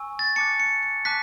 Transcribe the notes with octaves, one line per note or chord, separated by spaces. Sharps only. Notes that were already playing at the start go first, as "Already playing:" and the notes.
Already playing: G#5 C#6 E6
A6
A5 D6 F#6 C#7
C#7
C#7
A5 D6 F#6 B6